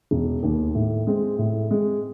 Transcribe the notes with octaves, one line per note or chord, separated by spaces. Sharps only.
E1
D#2 D#3
A2
G#3 C4
A2
G#3 C4